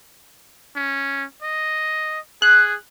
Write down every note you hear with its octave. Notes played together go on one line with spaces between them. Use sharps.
C#4
D#5
G#4 F#6